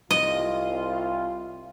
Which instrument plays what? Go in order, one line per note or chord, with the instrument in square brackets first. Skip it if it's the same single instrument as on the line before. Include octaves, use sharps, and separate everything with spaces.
[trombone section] C2 F4 [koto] D#5